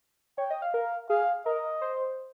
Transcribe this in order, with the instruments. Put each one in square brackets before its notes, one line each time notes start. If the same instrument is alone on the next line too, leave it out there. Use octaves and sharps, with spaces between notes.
[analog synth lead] C#5 [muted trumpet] G5
[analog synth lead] D#5
F5
[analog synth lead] A#4 [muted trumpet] F5
[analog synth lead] G#4 [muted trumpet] F5
[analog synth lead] A#4 [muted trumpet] D#5
[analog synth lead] C5